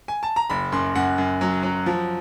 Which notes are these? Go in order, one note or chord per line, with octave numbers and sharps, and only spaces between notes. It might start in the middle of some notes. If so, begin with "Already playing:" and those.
G#5
A5
A#5
F#1 B5
F#2 C6
F#2 F#5
F#2
F#3
F#3
F3